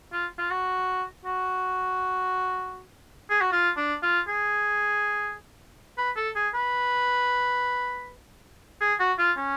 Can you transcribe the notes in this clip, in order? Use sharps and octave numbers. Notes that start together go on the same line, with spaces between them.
F4
F4
F#4
F#4
G#4
F#4
F4
D4
F4
G#4
B4
A4
G#4
B4
G#4
F#4
F4
C#4